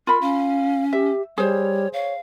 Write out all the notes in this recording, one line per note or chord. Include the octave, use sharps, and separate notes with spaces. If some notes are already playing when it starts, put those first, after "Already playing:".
F4 A#4 B5
C#4 F5
G4 E5
G3 G#4 C5 C#5
C#5 F5